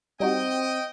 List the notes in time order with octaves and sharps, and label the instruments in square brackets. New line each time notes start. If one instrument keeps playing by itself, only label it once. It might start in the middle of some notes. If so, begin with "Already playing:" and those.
[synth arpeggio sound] G3 D#4 F#4 [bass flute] C4 [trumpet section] D#5 G5